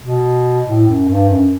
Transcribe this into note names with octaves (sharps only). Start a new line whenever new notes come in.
B2
A2
F#2
G2
F#2